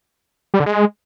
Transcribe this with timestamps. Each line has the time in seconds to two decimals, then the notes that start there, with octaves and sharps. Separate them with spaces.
0.54 G3
0.60 D3
0.66 G#3